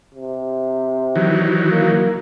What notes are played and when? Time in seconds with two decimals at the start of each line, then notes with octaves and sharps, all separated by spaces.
0.14 C3
1.16 D#3 E3 F#3
1.71 A#3